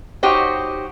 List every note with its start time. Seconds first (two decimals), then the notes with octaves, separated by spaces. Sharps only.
0.23 D#4 F#4 G4 C5 C#5